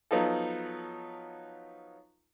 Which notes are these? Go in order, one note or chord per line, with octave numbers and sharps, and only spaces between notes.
F3 F#3 B3 D#4 F4 A4